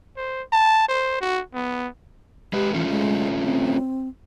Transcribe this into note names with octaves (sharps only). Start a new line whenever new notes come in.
C5
A5
C5
F#4
B3
G#3 G4 B4
E3 A3 C#4 F4
G#3
C4